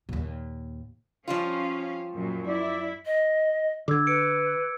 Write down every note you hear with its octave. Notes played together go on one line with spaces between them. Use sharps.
D#2 A#2
F3 G3 C#4 F4 F5
F#2 A#2
E4 D5
D#5
D3 D6 E6 G#6
B4 C#7 D7